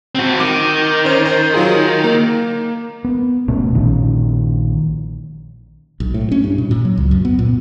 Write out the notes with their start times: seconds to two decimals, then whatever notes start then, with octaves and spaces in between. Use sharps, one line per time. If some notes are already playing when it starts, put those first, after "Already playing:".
0.15 C4 F#4
0.40 D#3 D6
1.05 C#4 C5 C#5
1.26 C5 G6
1.54 F#3 F4 G#4
2.04 A#3
3.05 B3
3.48 F1 B2 A3 C#4
3.75 A#1 A#2 D#3 C#4
6.00 B1
6.14 A2
6.31 C#4
6.44 G2
6.58 B2
6.71 A#2
6.85 F#3
6.97 C#2
7.11 F#2
7.25 B3
7.39 A#2